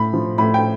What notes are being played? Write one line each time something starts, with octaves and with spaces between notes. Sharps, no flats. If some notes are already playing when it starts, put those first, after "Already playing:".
Already playing: A2 B5
F3
A2 B5
G5